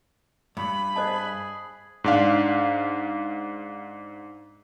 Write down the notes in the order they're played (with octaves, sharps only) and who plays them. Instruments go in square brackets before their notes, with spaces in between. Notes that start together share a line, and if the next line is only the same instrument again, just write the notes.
[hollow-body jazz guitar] G2 [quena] B5
[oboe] G#4 [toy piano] C5 D#5 A5
[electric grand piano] G#2 D4 F5